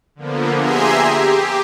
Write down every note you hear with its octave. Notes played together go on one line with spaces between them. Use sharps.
D3 F3 A#3 B3
G4 G#4 E5 G#5 A#5 C6
G4